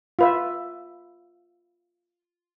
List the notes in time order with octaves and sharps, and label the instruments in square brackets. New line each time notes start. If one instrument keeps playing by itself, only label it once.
[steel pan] F4 B4 E5